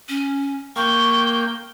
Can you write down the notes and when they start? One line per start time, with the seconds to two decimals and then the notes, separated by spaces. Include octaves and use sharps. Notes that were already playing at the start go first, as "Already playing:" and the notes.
0.08 C#4
0.76 A#3 G5 C#6